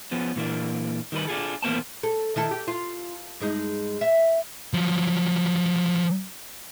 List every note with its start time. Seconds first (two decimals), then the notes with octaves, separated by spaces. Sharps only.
0.11 F3 B3 C#4
0.36 A#2 E3 A#3 D4
1.12 D#3 G3 D#4 B4
1.27 D4 F4 G#4 A4
1.63 E2 A#2 A#3 B3 C5 A5
2.03 A4
2.36 D#3 E4 A4
2.51 G4
2.68 F4
3.40 G2 G#3 D#4
4.01 E5
4.74 F3 F#3